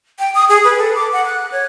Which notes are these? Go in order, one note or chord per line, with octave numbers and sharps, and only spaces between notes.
G5
D#6
G#4
B4
A4
D6
F#5
F#6
C#5